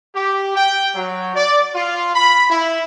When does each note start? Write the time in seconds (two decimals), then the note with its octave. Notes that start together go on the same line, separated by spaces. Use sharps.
0.15 G4
0.56 G5
0.96 F#3
1.36 D5
1.75 F4
2.15 B5
2.50 E4